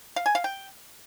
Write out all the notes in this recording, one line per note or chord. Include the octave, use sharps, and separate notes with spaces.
F5
G#5
F5
G5